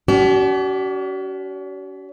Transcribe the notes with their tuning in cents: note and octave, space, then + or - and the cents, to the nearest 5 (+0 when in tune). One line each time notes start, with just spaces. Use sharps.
C#4 +40 F#4 +45 D5 +0